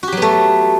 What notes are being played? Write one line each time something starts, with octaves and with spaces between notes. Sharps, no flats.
F#3 A3 B3 F#4 G4